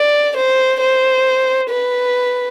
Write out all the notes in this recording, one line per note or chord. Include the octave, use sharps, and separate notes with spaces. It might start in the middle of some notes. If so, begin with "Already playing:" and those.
Already playing: D5
C5
C5
B4